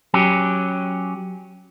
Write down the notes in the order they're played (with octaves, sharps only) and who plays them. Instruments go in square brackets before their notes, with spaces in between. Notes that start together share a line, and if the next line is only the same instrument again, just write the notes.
[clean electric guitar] F#3 C#4 G4